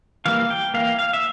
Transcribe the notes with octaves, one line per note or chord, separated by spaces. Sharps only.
E3 G3 A#3 F5
G5
E3 A#3 F5
F5
E5